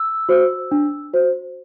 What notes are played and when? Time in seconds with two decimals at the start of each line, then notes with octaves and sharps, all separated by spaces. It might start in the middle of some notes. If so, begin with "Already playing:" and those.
Already playing: E6
0.29 F#4 C5
0.72 D4
1.13 F#4 C5